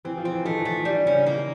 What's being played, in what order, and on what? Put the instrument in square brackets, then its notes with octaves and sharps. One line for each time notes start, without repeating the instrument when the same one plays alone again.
[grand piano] E3 [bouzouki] C4
[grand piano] F3
[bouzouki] C4
[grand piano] E3
[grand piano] D#3 [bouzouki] A3
[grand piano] E3
[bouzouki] A3
[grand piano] F3
[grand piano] E3 [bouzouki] G3
[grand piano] D3
[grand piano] C#3 [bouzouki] C#4
[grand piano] D3
[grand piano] D#3 [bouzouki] A#3